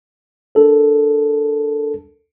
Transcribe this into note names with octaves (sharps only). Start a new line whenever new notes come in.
D4 A4 A#4